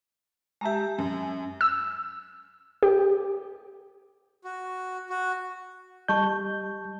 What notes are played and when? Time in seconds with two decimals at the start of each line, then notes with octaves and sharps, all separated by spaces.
0.61 G#3 G4 E5 A5 A#5
0.98 F#2
1.61 E6
2.83 G4
4.44 F#4
5.10 F#4
6.08 G3 D#5 A5 C#6 G6